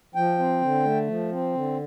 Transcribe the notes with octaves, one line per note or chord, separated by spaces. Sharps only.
F3 G5
C4
D3
A3
F3
C4
D3